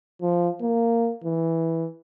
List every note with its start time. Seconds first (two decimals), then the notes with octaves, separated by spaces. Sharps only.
0.22 F3
0.62 A#3
1.24 E3